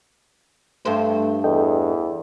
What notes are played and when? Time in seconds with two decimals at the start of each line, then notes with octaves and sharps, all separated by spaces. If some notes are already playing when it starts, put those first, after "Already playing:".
0.85 G2 A3 C5
1.44 E2 A4 D#5 G5